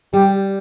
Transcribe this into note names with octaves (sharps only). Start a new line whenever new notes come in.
G3 G4